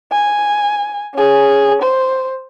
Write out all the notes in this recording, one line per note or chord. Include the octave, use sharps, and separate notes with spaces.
G#5
C#4 G#4
C5